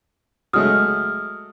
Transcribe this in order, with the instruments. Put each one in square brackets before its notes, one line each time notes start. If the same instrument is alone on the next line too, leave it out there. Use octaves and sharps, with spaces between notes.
[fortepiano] F#3 G#3 A3 [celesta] D#6 F6